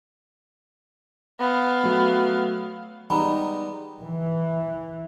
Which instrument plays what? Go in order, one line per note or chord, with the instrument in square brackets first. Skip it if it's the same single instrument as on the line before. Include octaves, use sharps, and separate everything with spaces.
[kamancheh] B3 F5
[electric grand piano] F#3 A3
[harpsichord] G3 G#3 B3 [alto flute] D#4 [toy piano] A#5 B5
[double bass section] E3